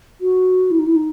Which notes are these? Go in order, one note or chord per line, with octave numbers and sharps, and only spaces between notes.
F#4
E4
D#4
E4
D#4